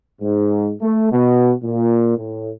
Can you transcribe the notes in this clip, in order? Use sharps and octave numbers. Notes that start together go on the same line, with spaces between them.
G#2
A3
B2
A#2
A2